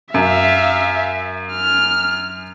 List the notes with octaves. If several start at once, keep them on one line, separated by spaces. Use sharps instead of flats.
F#2 E5 F5
F6